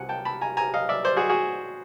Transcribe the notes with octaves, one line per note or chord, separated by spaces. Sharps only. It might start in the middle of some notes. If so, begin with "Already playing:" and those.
Already playing: C2 C3 F3 F#5 G#5
G5 A5
A5 B5
G#5 A#5
G#5 A#5
D#5 F5
D5 E5
C5 D5
F#4 G#4
F#4 G#4